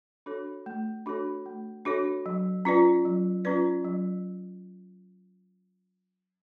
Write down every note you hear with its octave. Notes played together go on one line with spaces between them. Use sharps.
D4 F#4 A4 C#5
A3
D4 F#4 A4 C#5
A3
D4 F#4 A4 C#5
F#3
C#4 F4 B4 D5
F#3
C#4 F4 B4 D5
F#3